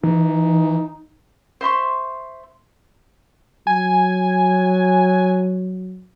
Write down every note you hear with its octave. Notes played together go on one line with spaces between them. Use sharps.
E3 D#4
C5 E5 C6 C#6
F#3 G#5